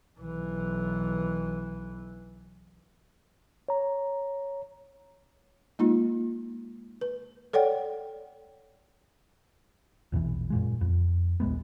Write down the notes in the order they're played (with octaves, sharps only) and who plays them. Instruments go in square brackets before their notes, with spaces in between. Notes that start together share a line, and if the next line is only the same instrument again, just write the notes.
[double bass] B1 E3
[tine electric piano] C#5 A#5
[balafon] G#3 A#3 D#4 F4
B4
A4 C#5 D5 F#5 G5
[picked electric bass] A#1 E2 B2 E3
F#2 A#2 G#3
F2
D#1 A#1 G#3 B3